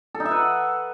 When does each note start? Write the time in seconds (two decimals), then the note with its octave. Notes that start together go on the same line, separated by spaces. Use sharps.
0.15 A4
0.20 D#4
0.25 E5
0.31 B4
0.36 F#5